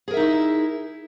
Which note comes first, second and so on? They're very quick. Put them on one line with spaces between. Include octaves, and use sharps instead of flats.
G#4 A#4 E5 D#4 E4